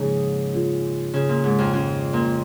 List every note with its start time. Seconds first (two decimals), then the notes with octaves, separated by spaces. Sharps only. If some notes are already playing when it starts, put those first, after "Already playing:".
Already playing: G#2 C#3 F3 A#3 D#4 G#4
0.53 F3 A#3 F4 G#4
1.13 C#3
1.29 A#2
1.44 G#2
1.58 F2
1.73 F2 D#3 C#4 F4
2.13 A#2